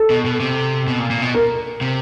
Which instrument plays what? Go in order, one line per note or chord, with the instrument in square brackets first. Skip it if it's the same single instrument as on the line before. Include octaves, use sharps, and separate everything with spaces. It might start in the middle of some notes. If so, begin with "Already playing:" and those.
Already playing: [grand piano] A4
[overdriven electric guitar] B2
B2
C3
B2
A#2
A#2
B2
[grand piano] A#4
[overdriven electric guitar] C3